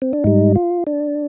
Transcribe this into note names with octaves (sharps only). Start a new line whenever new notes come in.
C4
D4
G#2 G3 D#4
F4
D4